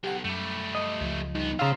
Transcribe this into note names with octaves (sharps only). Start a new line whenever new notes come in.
B1 G4 F#5
F#2 G3 A3
D#5
C#2 F3
G2 B3 D#4
C#3 F4 C5 F5 A#5 C6 E6